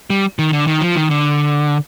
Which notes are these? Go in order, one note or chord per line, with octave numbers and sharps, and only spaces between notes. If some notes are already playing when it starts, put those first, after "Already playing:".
G3
D#3
D3
D#3
F3
D#3
D3